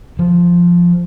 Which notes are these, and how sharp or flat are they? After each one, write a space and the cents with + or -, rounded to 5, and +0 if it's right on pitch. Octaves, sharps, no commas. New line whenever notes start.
F3 +0